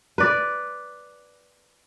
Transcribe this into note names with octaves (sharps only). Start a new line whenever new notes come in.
B4 D5